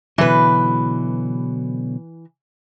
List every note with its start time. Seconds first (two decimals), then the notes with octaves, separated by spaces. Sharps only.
0.18 B2 D3 E3 F#3 B4